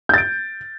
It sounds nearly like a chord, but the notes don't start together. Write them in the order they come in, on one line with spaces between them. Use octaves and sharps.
G6 A6 D7